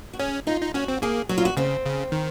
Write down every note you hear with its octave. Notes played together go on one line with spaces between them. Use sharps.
F#4
C#4 G#4
D#4 F4
D#4
C#4 F#4
C4
A#3 G#4
F#3 F#4
F4
F#4
C#3 C4
C#3
D#3